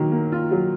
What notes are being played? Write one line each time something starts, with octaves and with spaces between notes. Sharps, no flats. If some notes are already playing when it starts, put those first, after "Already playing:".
Already playing: D#3 F#3 A#3
A#3
F4
F#3